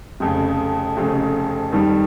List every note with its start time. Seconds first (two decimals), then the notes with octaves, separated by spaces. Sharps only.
0.20 F1 F2 C#3
0.97 F1 F2 C#3
1.73 F2 D#3 G3